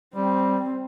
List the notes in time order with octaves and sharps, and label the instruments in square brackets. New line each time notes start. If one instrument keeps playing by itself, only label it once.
[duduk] G3 [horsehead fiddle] C4